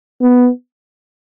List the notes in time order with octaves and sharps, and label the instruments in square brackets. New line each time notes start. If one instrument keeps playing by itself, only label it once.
[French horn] B3